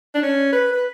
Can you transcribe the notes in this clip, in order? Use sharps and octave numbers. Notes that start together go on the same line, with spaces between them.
D4
C#4
B4
B4